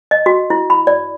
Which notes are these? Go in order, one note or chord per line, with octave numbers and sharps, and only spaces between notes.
D#5
F#4
E4
B5
D5